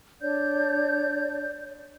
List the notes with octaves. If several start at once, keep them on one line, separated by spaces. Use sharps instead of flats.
D4 C#5 D5 G6